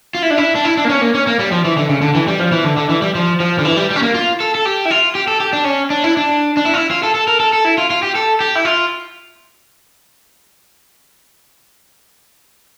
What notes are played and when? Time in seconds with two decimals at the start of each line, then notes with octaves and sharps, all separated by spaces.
0.15 F4
0.23 E4
0.30 D4
0.38 E4
0.55 D4
0.65 E4
0.77 D4
0.85 A#3
0.89 C#4
1.01 A#3
1.15 C#4
1.27 A#3
1.39 G3
1.52 F3
1.65 E3
1.77 D3
1.89 C#3
2.02 D3
2.15 E3
2.28 G3
2.39 F3
2.52 E3
2.64 D3
2.77 D3
2.89 E3
3.02 G3
3.15 F3
3.40 F3
3.59 D3
3.65 E3
3.77 G3
3.90 G3
3.96 C#4
4.02 A#3
4.14 F4
4.40 A4
4.55 A4
4.65 G4
4.85 E4
4.91 F4
5.15 G4
5.28 A4
5.40 G4
5.53 D4
5.64 C#4
5.90 D4
6.04 E4
6.17 D4
6.57 D4
6.65 E4
6.74 F4
6.77 E4
6.91 F4
7.03 A4
7.15 A4
7.28 A#4
7.40 A4
7.53 A4
7.65 E4
7.78 F4
7.90 F4
8.03 G4
8.15 A4
8.40 G4
8.55 E4
8.65 F4